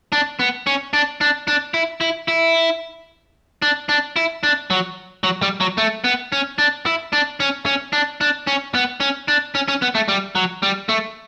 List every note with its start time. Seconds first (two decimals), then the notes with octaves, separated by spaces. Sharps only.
0.12 D4
0.39 B3
0.67 C#4
0.93 D4
1.21 D4
1.48 D4
1.74 E4
2.01 E4
2.28 E4
3.62 D4
3.89 D4
4.16 E4
4.43 D4
4.70 F#3
5.24 F#3
5.42 G3
5.61 F#3
5.78 A3
6.04 B3
6.32 C#4
6.58 D4
6.86 E4
7.13 D4
7.40 C#4
7.66 C#4
7.93 D4
8.21 D4
8.47 C#4
8.75 B3
9.00 C#4
9.28 D4
9.55 C#4
9.68 C#4
9.82 B3
9.95 A3
10.08 G3
10.35 F#3
10.63 G3
10.89 A3